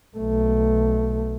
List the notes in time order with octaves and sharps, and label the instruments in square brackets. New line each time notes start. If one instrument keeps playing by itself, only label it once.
[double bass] B1 A3